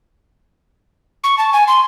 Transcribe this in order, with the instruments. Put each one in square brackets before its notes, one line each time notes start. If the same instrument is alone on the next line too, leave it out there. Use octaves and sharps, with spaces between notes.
[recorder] C#6
A5
G#5
C6